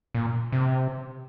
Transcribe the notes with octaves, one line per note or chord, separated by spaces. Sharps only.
A#2
C3